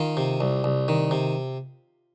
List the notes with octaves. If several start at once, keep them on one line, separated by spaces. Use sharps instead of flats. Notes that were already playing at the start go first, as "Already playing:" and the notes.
Already playing: D#3 F4
C3
C2
C2
D#3
C3